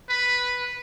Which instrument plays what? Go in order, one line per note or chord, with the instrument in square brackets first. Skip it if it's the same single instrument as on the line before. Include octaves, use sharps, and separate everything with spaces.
[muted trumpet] B4